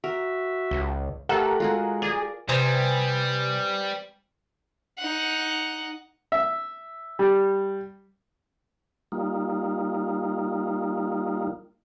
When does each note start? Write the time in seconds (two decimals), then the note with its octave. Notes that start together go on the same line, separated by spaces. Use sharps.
0.04 F#4 A#4 E5
0.71 C#2
1.29 A3 G4 A4 A#4 F#5
1.60 G#3 F4 F#4 G#4
2.02 G#4 A#4 D5
2.49 C3 G3 B3 C4 G#5
4.98 D#4 F#5
6.32 E5
7.19 G3
9.12 G3 A#3 D#4 F4